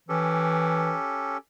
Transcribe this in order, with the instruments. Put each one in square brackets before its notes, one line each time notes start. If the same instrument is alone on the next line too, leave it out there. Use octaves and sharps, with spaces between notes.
[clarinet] E3 [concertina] C#4 G4 A4